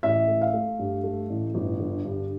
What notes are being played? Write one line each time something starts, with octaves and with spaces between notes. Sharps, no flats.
A1 E5
A3
F5
A3
G2
A3
A1
G1
D3
G2